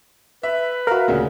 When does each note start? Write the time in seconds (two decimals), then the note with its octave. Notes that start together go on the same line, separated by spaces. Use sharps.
0.43 B4 E5
0.87 F#4 A#4 E5 F5
1.08 D2 A#2 C#3